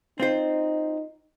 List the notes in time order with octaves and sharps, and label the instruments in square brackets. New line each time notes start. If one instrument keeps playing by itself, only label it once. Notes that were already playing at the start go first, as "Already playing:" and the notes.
[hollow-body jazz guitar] C4 F4 C5 [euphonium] D#4